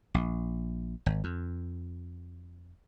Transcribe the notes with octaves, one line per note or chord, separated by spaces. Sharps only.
A#1
G#1
F2